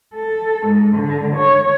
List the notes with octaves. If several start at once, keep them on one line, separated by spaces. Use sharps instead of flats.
A4
G#2
D3
C#5